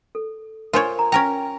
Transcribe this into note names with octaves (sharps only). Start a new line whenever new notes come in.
A4
F4 A#4 C5 C#5 G#5
A#5
C#4 A#4 G5 A#5